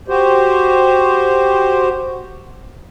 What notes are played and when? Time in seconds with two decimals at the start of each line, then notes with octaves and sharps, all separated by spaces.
0.08 F#4 G4 C5